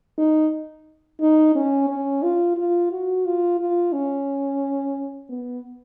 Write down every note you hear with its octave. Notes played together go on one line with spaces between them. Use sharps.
D#4
D#4
C#4
C#4
F4
F4
F#4
F4
F4
C#4
B3